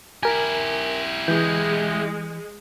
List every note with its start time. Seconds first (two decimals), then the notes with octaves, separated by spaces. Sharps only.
0.23 E4 G4 A#4 G#5
1.28 E3 G#3 G6